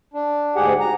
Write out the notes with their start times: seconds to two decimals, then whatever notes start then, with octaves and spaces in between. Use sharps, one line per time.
0.14 D4
0.55 D2 G#2 G4 G#4 F#5
0.80 A#5